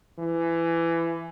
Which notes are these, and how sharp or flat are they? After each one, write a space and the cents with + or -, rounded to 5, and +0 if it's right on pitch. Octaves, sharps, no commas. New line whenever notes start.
E3 +20